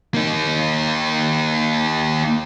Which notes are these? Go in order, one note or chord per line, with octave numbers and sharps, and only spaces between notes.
A#3 D#4